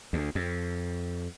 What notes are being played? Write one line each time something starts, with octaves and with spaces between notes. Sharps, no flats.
D2
F2